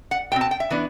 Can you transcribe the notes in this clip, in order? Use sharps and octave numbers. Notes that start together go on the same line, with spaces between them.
F#5
B2 A3 C4 G5
A5
G5
E5
E3 B3 D4